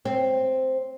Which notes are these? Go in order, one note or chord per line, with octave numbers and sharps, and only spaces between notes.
C4